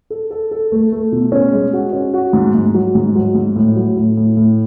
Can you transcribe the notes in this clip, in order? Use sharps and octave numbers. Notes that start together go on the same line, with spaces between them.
A4
A4
A4
A3
A3
B2
C#4
G#3
F#4
C#4
F#4
G#2
G#2
F#3
G#2
F#3
G#2
A2
F#3
A2
A2
A2